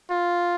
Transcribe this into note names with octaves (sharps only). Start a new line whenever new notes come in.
F4